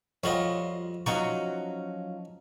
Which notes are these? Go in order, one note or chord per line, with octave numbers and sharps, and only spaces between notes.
F2 G3 F4 F#4 C#5 D#5
F3 F#3 C#4 D#4 C#6